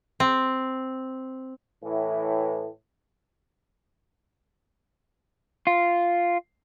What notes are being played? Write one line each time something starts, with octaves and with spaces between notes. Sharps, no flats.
C4
A2 E3
F4